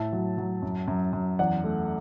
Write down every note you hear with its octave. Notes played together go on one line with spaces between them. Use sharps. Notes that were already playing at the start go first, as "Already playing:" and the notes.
Already playing: A2 E5 A5
F#3
F#3
F#2
F#2
F#2
E2 D5 F#5
A3